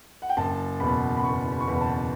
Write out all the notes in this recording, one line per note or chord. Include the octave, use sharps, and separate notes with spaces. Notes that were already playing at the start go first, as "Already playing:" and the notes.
F#5
G5
F#1 A5
E2 B2 B5
B5
F#1 C#6
B5
C#6
E2 B2 B5
A5